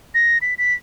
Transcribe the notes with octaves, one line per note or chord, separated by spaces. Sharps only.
A#6
B6
B6